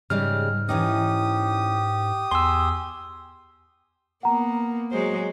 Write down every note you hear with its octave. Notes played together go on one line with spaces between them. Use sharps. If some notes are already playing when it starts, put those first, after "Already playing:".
G#2 C#3 G3 G#3 F6
E3 C#4 D#4 G4 D#6
E2 G#5 C6 E6
A#3 B3 F#5 A#5
F#3 G#3 C5